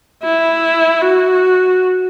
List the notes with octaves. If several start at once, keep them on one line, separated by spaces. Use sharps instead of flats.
E4
F#4